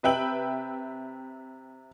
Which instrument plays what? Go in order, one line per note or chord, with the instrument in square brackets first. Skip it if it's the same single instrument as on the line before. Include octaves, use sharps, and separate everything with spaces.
[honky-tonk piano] C3 B4 E5 G5 F#7